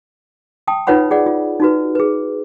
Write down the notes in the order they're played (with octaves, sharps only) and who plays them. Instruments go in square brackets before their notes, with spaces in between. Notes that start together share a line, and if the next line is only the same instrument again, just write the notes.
[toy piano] G5 A5 D#6
D#4 F4 B4 C#5 F#5 B5
G#4 D5 F#5
F4
D#4 F#4 B4
G#4 B4